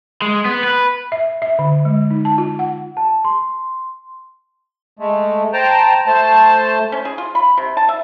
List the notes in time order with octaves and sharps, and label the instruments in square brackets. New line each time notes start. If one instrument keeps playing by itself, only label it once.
[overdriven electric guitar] G#3
B3
B4
[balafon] E5
E5
D3
G#3
D#4
A5
F4
F#5
[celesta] A5
C6
[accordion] G#3 A3
C5 G5 A5 A#5
A3 C5 A5
[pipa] C#4
G#4
F4
B5
C3
A5
E5